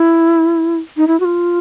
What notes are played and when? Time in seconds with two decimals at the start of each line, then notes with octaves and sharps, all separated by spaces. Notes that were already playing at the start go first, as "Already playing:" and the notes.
Already playing: E4
0.97 D#4
1.07 E4
1.20 F#4
1.25 F4